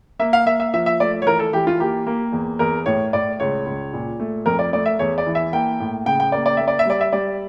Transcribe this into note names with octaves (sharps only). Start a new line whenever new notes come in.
A#3 E5
F5
A#3 E5
E5
F3 E5
E5
A3 D5
C#5
E3 A#4
A4
E3 G4
F4
A#3 G4
A#3
E2
E2 A#4
A2 C#5
A2 D5
C#2 C#5
C#2
A#2
A3
F2 A#4
D5
A3 D5
E5
E2 C#5
D5
E3
E5
A#3 G5
A2
C#3 G5
G5
A#3 D5
D5
A#3 E5
D5
E5
G3 D5
E5
G3 D5